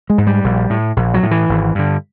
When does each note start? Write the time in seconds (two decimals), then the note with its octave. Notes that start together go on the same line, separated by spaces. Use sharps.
0.10 G#3
0.18 G#2
0.27 G3
0.44 A#1
0.70 A2
0.96 A#1
1.14 F#3
1.23 A2
1.31 E3
1.49 G#1
1.75 G2 D3